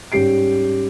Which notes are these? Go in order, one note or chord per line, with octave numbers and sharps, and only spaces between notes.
G#2 G3 C#4 G4 C7 D7